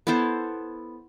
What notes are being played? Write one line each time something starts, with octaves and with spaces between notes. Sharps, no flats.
B3 E4 A4 C5